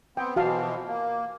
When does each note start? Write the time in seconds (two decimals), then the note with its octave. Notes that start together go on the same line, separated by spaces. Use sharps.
0.17 B3 C4 G5
0.36 B2 E3 F3 F#4 F5 A5
0.87 A#3